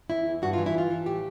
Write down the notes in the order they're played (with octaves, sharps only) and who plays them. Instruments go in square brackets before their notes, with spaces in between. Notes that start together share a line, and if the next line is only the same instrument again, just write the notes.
[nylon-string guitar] E2 E4
E2
G2 F#4
E3 F4
E4
G2 F4
E3
A2 G4